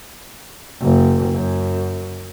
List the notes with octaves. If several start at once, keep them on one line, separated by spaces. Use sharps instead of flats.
F#1
F#2